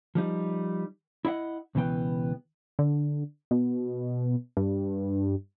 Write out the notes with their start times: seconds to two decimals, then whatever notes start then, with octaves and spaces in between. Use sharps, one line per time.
0.15 F3 G3 D#4
1.25 E4 D#5 E5 F#5
1.75 C#2 B2 E3 B3 G5
2.79 D3
3.51 B2
4.57 G2